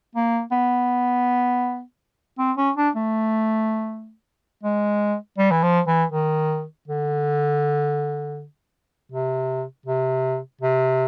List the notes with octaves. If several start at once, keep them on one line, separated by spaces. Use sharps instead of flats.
A#3
B3
C4
C#4
D4
A3
G#3
G3
E3
F3
E3
D#3
D3
C3
C3
C3